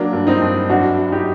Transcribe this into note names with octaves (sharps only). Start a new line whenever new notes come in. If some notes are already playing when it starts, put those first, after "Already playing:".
Already playing: F#3 A#3 D4
G2
C4 D#4
G2
F#2 D4 F#4
F#2
D#4 G4